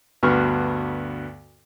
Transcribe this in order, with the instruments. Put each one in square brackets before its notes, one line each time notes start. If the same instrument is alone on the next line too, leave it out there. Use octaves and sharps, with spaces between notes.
[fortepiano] D2 G2 B3 F#4 C#6 F6